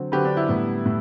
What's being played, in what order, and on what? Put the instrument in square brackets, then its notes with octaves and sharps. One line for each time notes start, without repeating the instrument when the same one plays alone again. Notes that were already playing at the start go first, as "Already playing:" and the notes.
Already playing: [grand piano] D3 F#3 C4
D3 F#3 C4 G4 B4
D4
E4
A2 G3 B3
A2